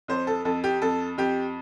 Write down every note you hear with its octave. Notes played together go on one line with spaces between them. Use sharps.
F2 C5
A4
F2 A4
G4
F2 A4
F2 G4